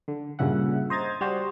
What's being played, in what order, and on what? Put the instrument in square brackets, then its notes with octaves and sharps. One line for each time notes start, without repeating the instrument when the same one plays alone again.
[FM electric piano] D3
G2 A#2 C#3 E5 F#5
C5 D#5 A#5 G#6 A6
G3 F#4 C5